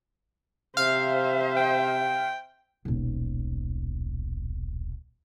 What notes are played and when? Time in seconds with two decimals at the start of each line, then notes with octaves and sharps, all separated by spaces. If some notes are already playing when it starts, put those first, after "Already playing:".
0.77 C3 C5 E5 F5
1.57 G5
2.85 D#1 B1